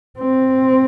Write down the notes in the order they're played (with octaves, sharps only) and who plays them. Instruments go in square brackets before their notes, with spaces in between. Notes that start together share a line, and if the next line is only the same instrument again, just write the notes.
[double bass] C4